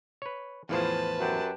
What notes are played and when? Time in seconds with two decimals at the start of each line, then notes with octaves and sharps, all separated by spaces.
0.22 B4 C#5
0.69 E2 A2 F3 F4 G#4 B4 C5 A5
1.20 F#2 G4 F#5